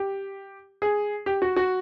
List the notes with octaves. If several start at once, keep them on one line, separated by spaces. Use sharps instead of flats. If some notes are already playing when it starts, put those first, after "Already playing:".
Already playing: G4
G#4
G4
F#4
F#4